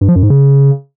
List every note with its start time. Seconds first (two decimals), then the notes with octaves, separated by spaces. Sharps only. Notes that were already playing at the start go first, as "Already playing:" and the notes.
0.01 G2
0.08 F3
0.16 F#2
0.23 G#2
0.30 C#3